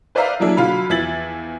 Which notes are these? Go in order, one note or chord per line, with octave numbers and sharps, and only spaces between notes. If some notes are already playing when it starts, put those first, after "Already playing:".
B4 C5 D5 E5 F5 A#5
F3 F#3 A#3 D4 E4 G#4
D3 F#3 F4 F5 B5
E2 F3 E5 G#6 A6 F#7